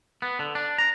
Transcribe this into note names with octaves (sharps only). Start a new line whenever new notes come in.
B3
D3
D4
A#5